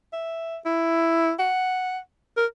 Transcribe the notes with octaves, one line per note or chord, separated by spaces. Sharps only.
E5
E4
F#5
A#4